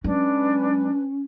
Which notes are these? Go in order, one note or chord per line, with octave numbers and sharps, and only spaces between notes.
F#3 G#3 C#4 D4 B4